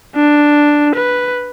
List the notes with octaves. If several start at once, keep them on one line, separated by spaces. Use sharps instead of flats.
D4
B4